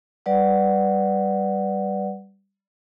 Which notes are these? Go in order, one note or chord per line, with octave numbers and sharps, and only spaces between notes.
G3 B4 D5 F#5